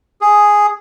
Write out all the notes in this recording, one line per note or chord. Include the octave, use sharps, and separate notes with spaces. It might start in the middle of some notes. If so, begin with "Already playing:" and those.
G#4